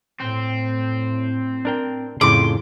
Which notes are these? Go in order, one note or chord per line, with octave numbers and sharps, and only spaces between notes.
A2 C4
D4 A#4 G5
F2 A2 C#3 C6 D6